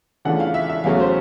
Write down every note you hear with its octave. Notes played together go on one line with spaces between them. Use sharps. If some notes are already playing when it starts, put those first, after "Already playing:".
C#3 E3 A3 D4 F4 F#5
F5
E5
E5
E2 C#3 F#3 A3 C#4 F5
C5